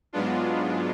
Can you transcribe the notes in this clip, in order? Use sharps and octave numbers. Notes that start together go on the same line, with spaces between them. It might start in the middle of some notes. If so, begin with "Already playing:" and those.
G#2 F#3 G#3 B3 D4 F4